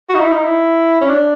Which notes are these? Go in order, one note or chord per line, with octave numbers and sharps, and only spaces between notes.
F#4
D#4
E4
D#4
E4
C#4
D4